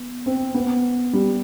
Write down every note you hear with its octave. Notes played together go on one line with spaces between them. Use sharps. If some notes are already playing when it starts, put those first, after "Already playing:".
Already playing: B3
C4
B3
G3